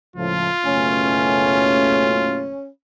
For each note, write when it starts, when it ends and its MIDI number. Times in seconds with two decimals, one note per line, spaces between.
0.16 0.49 37
0.16 0.49 45
0.16 0.49 53
0.16 2.44 65
0.65 2.55 30
0.65 2.55 47
0.65 2.55 57
0.65 2.69 61